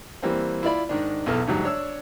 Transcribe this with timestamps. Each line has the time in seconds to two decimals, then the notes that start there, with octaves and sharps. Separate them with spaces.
0.22 E3 G3 A#3 C4
0.63 E4 F4 D5 B5
0.89 G#2 D#3 D4
1.26 B1 E2 A4 F6
1.47 D2 G#2 F#3 G3
1.64 D4 C#5 E6